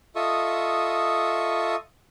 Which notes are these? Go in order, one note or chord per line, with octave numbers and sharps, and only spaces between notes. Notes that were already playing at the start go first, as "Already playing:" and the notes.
F4 A4 D#5 E5 C#6 D#6